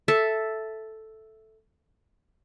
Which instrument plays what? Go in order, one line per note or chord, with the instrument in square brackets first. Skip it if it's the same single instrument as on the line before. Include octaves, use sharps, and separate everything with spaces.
[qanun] A4 E5